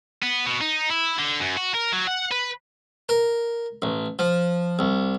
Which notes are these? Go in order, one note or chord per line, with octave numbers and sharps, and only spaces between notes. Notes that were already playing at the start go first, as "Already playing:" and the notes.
B3
B2
D#4
E4
D3
F#2
F#4
A#4
F#3
F#5
B4
A#4
A1
F3
C2